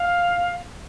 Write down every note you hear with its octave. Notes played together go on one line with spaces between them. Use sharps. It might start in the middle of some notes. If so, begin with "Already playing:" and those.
Already playing: F5